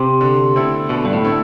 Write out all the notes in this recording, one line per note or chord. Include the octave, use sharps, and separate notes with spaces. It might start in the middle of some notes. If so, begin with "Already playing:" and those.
Already playing: C3
D3
A3 C4 E4 A4
B2 D3
G2
A2
A3 C4 E4 A4